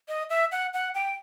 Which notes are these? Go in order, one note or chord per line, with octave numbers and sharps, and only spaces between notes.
D#5
E5
F#5
F#5
G5